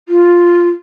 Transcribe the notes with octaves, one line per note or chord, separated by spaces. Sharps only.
F4